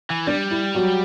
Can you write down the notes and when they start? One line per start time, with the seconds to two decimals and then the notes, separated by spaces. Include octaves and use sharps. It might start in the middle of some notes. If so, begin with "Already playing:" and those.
0.10 E3
0.27 G3 D4
0.51 E4
0.75 F#3 F#4